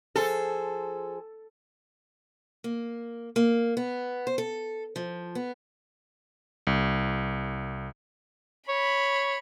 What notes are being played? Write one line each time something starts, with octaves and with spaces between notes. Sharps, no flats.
F3 G#4 A4 C5
A#3
A#3
B3
C5
A4
F3
B3
C2
C#5 B5